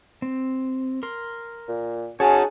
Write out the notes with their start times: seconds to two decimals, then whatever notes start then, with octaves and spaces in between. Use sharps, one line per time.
0.22 C4
1.03 A#4 C6
1.69 A#2
2.20 C#4 D#4 F#4 G#4 C#5 A5